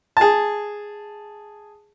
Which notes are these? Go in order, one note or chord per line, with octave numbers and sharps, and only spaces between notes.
G#4 A5